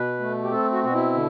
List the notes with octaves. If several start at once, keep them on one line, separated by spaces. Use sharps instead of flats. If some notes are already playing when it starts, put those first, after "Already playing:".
Already playing: B2 B4
A3
G4
C4 A4
F#4
B2 F#4
E4
D3